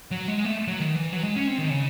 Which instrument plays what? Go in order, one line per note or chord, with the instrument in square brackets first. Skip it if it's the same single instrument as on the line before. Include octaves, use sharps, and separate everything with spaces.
[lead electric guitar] F#3
G#3
A3
F#3
D#3
E3
F#3
G#3
C#4
C4
D#3
C#3